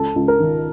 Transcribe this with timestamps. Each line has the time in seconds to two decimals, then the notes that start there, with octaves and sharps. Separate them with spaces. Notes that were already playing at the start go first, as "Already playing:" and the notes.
Already playing: C#2 A4
0.16 C#2
0.28 A#4
0.40 D#3